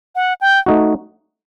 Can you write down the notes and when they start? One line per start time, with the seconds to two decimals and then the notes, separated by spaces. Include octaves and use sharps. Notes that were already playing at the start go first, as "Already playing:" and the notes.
0.15 F#5
0.41 G5
0.66 A3 D#4 F#4